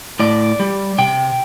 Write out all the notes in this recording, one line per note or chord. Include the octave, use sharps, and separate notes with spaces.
A2 D5
G3
C3 G5